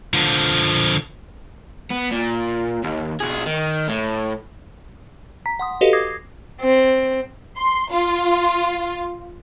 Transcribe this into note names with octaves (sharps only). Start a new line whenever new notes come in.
D3 F3
B3
A#2
D#2
B1 G#4
D#3
A2
A#5 B6
F#5 C6 D#6
F#4 G4 A4 B4 D#5 F5
D6 D#6 G#6 A#6 C7
C4
C6
F4